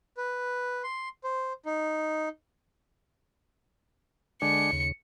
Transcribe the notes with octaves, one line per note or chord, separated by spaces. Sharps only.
B4
C6
C5
D#4
D3 G#3 D4 C#7
D#2 C#3